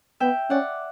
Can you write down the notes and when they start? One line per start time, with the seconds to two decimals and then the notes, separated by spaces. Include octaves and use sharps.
0.20 B3 E5 G5
0.50 C#4 D5 F#5